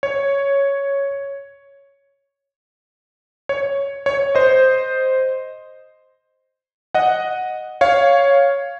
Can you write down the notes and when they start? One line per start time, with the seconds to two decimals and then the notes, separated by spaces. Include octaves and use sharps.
0.03 C#5
3.49 C#5
4.06 C#5
4.35 C5 D#5
6.95 D#5 F#5
7.81 C#5 F5